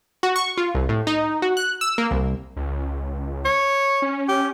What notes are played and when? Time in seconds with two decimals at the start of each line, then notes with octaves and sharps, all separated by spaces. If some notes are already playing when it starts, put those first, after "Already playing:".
0.23 F#4
0.36 C#6
0.57 F4
0.75 C2
0.89 A2
1.07 D#4
1.42 F#4
1.57 F#6
1.81 E6
1.98 A#3
2.11 C2
2.56 C#2
3.45 C#5
4.02 C#4
4.28 G4